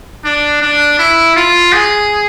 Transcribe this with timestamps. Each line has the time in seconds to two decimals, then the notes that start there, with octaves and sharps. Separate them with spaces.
0.24 D4
0.62 D4
0.99 E4
1.36 F4
1.73 G#4